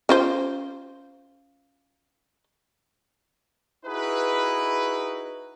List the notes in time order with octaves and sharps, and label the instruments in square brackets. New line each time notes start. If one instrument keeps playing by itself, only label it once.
[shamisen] C#4 F4 C5
[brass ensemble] D#4 E4 F#4 G#4 B4